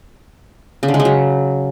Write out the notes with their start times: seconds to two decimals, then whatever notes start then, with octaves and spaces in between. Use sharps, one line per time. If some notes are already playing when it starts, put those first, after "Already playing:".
0.83 C#3
0.88 D3
0.94 G#3
1.00 C#3
1.05 F#3